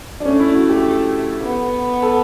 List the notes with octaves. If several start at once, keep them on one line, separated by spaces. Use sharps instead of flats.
D4
A3 C#4
E4
F#4
G4
B3
A4